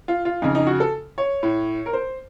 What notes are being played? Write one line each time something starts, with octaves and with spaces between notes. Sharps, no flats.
F4
F4
F2 C#3 D#4
D#4
F#4
A4
C#5
A2
A#4
C5